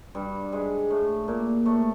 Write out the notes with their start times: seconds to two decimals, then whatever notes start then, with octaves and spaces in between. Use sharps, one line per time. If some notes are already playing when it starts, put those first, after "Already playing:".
0.15 G2 G3
0.52 G#2 G#3
0.90 A2 A3
1.28 A#2 A#3
1.65 A2 A3